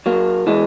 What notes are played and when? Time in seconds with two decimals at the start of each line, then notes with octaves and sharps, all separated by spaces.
0.06 F#3 A#3
0.47 E3 G#3